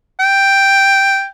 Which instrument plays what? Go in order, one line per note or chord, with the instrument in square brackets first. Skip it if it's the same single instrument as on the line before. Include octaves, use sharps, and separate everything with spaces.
[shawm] G5